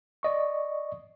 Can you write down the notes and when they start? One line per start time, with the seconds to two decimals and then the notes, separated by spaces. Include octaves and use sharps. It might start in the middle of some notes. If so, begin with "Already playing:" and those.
0.23 D5 D#5 C#6